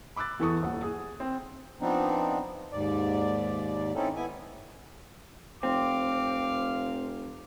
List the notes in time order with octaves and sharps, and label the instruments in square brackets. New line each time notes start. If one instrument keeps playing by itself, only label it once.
[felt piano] B5 D6 E6 F#6 A6
E2 E3 A4 C#6 D#6
D#1 F#5
G#4
C4
[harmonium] F3 B3 C4 D4 D#4
D#2 G#2 D5
C4 C#4 D#4 E4 A4
B3 E4 G#5
[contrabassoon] F1 [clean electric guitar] C4 [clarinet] F5 [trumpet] D6